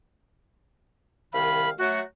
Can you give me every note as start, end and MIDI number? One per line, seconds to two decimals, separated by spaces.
1.33 1.70 36
1.33 1.70 51
1.33 1.70 77
1.33 1.70 83
1.79 2.00 54
1.79 2.00 57
1.79 2.00 66